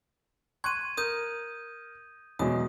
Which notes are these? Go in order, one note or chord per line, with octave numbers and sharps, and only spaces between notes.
C6 C#6 F#6 G#6 D#7
A#4 D#6 G6 D#7
E2 B2 F#3 G#3 D#6